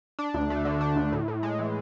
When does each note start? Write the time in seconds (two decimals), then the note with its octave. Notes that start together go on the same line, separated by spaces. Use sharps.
0.19 D4
0.34 D2
0.50 A3
0.65 D3
0.81 D4
0.96 D2
1.12 A2
1.28 A2
1.43 G#3
1.59 E3